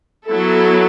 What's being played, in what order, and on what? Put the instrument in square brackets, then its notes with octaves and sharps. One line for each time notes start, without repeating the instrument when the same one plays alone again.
[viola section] F#3 B3 E4 A4